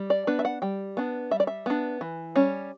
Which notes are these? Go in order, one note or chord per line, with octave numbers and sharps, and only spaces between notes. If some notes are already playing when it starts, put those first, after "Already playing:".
Already playing: G3
D5
B3 D4 B4
E5
F#5
G3 G5
B3 D4
G3 E5
D5
E5
B3 D4
E3
G3 C#4